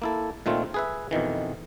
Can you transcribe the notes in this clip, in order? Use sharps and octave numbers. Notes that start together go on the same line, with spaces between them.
A#3 E4 A4
A#2 D#3 A3 C4 F4
G#4 B4 E5
F2 B2 D#3 E3